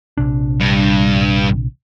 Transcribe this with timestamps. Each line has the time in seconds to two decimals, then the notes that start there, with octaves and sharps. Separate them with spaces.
0.17 A#1 C3 D4
0.60 G2